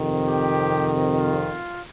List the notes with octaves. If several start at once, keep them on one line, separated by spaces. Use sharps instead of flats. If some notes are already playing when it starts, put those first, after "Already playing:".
Already playing: F2 C3 D#3
G4
F4